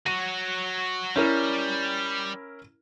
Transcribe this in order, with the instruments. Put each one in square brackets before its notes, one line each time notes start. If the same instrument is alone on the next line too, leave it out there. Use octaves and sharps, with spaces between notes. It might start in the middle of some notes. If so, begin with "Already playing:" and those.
[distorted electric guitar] F#4 C#5 [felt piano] D#7
[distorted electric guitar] G3 [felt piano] C#4 E4 A#4